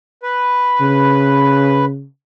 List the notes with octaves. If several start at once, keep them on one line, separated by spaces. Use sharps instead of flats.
B4
C#3